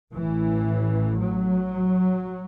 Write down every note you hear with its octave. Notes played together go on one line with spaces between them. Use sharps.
A1 A2 E3
F#3